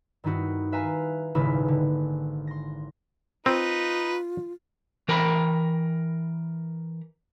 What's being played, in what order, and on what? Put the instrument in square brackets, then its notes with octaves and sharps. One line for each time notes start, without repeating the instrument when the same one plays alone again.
[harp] G2 D#3 C4 D#4 E4 F#4
B4 E5 F5 G#5 A#5 F#6
D#1 G#1 C#3 D#4 E4 B4
D3
C6 A#6
[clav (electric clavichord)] C4 [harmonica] D#4 B4 [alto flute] F4
[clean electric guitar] E3 A#4 G5 A#5 B5